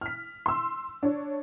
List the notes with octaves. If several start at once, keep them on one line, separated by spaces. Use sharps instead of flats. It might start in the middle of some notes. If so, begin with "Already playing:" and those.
F6 B6
C6 E6
D4 C#5